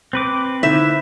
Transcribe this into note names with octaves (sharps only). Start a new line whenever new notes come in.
C4 B4 D6
D3 D#4 E4 C5 E5